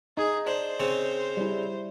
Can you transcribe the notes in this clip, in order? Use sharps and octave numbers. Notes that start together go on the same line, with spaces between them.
D#4 G#4
D4 C5
C#3 C4 C#4
G3 E4